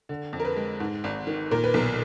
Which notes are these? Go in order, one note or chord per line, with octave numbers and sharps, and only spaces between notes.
D3
F2
A#4
B4
G#3
G#2
G#1
D#3
A#2 A#4
B4
B1 A#4